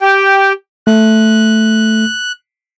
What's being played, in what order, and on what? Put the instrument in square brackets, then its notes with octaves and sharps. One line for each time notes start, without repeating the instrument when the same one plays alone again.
[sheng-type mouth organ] G4 G5
[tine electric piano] A3 [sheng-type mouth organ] F#6